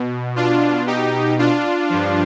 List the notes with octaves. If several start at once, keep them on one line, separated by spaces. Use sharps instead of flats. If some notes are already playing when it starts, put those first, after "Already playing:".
Already playing: B2
D4 F4
D#4 G4
D4 F4
G2 F3